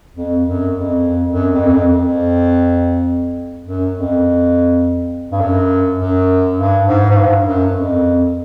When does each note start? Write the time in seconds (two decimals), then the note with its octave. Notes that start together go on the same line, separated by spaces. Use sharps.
0.16 F2
0.46 F#2
0.75 F2
1.33 F#2
1.52 F2
1.67 F#2
1.72 F2
1.92 F2
3.66 F#2
3.96 F2
5.31 G2
5.40 F#2
5.99 F#2
6.58 G2
6.86 G#2
7.10 G#2
7.15 G2
7.44 F#2
7.74 F2